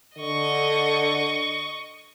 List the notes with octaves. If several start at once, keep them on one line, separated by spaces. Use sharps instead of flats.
D3 D#5 C#6